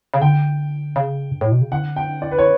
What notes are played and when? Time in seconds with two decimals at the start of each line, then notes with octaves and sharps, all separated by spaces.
0.14 C#3
0.21 D3 G5
0.96 C#3
1.31 G2
1.41 A2
1.52 B2
1.61 C#3
1.71 D3 F#5
1.96 G5
2.22 D5
2.31 B4
2.39 C#5